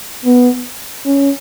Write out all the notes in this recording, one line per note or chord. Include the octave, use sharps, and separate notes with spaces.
B3
C#4